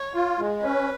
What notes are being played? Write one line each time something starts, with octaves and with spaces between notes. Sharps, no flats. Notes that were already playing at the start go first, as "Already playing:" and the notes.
Already playing: C#5
F4
G#3
C#4 B4